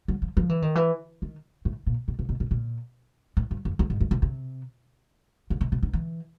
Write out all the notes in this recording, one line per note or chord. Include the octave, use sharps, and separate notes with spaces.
F#3
F3
F3
E3
D#3
E3
D#3
A2
A#2
B2
C3
B2
B2
A#2
A2
G2
F2
E2
G#2
G2
C3
C3
C#3
C3
C3
D3
E3